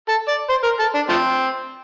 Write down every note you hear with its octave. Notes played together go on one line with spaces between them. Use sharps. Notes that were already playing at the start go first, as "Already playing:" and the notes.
A4
D5
C5
A#4
A4
D4
F3 A3 C4